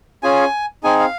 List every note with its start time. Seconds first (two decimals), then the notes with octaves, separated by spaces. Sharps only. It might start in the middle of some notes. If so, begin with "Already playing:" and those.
0.23 C#4 F4 G#4 G#5
0.84 C4 D#4 G#4 G#5
0.99 F5